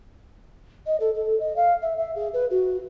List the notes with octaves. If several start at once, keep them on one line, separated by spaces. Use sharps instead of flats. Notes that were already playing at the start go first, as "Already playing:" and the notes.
D#5
A4
A4
D#5
F5
E5
E5
G#4
B4
F#4